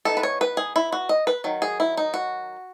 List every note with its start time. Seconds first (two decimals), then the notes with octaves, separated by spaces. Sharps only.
0.05 E3 B3 D#4 A4
0.17 B4
0.23 C#5
0.41 B4
0.57 G#4
0.76 E4
0.92 F#4
1.09 D#5
1.27 B4
1.44 D#3 F#3
1.62 G#4
1.80 E4
1.97 D#4
2.14 F#4